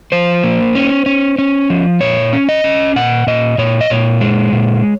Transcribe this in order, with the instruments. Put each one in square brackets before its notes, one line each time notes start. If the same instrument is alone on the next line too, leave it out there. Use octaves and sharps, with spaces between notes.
[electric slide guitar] F3 C5
A#3
C#4
C#4
C#4
F3
A#2 C#5
C#4
D#5
C#4
A#2 F#5
A#2 D#5
A#2 C#5
D#5
A#2 C#5
G#3
A#2